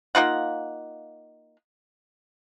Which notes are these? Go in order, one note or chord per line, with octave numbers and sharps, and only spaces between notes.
A#3 D#4 F4 F#5